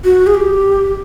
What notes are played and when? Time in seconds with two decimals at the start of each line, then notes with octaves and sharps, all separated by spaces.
0.04 F#4
0.27 G#4
0.35 G4